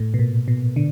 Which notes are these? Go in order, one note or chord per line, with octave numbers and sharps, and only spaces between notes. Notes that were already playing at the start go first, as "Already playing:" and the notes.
Already playing: A2
B2
A#2
B2
D3